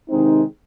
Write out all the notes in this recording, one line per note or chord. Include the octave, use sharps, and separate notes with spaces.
C3 D#3 G#3 C4 D#4